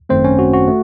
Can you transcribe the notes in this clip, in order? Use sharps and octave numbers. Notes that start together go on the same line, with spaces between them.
G#1 F#2 D#3 A3 C4 C5
C#4 C#5
F#4
F#4
A3